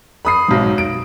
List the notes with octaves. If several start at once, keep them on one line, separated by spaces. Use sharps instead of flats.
B5 D#6 C7
B1 G#2
D7